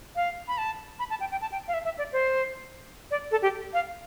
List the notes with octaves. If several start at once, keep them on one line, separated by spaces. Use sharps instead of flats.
F5
B5
A5
B5
A5
G5
G5
A5
G5
F5
E5
E5
D5
C5
D5
A4
G4
F5